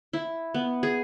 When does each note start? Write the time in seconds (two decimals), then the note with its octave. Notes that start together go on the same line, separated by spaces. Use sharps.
0.13 E4
0.54 B3
0.83 G#4